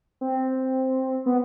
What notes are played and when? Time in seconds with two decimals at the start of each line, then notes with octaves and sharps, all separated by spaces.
0.21 C4
1.26 B3